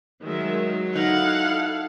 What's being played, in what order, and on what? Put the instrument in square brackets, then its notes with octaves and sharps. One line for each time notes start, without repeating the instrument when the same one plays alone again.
[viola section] D#3 G#3 E5 [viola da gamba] F#3
[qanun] D#4 A#5 [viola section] E4 A4 F5 [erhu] F#5